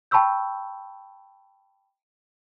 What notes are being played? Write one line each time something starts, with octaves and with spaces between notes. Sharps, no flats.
G5 A5 B5 C#6 E6 G6